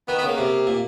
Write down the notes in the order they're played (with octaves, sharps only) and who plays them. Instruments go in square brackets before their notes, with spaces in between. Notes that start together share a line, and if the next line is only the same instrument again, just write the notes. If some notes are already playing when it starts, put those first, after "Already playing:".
[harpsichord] D#3 [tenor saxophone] B3
[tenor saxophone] B3
[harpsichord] C#3 [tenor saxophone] A#3
[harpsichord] C3
A#2